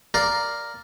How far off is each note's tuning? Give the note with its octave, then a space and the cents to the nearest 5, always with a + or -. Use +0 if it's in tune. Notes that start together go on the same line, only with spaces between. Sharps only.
A#4 +0 D5 +0 F5 +0